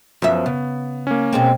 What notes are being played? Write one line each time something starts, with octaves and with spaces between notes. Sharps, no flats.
F#2 F3 B3 E5
C#3 B3
A#3 C#4
B2 G#3 C4